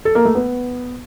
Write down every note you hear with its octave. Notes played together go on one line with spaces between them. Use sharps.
A4
A#3
A3
B3